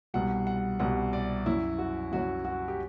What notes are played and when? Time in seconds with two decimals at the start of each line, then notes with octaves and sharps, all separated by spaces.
0.14 C2 B2 G3 F#5
0.47 F#5
0.80 C2 B2 G3 F#5
1.13 D5
1.46 F#2 F#3 E4
1.79 F#4
2.12 F#2 F#3 F#4
2.45 F#4
2.68 G4